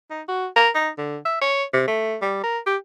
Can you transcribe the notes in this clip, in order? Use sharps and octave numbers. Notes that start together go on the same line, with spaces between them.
D#4
F#4
A#4
D#4
D3
E5
C#5
C3
A3
G3
A#4
G4